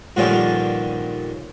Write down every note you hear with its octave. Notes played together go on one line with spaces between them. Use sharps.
G2 A#2 D3 D#3 F3 C#4